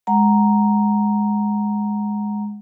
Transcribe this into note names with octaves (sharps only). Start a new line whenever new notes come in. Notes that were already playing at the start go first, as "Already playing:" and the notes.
G#3 F#5 A#5